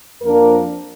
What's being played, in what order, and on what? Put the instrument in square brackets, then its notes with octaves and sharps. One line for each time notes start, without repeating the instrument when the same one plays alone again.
[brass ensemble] F2 F3 A#3 D4 A#4